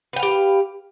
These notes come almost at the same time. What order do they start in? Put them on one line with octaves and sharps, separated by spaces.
B4 G5 F5 G4